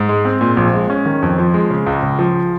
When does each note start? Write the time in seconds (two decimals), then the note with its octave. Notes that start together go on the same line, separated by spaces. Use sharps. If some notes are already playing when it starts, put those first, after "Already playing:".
Already playing: G#2
0.09 G#3
0.25 C4
0.41 A#2
0.57 A#1
0.73 G#3
0.90 C#4
1.06 D#3
1.22 F2
1.38 F3
1.54 G#3
1.70 C#3
1.86 C#2
2.03 C#3
2.19 F3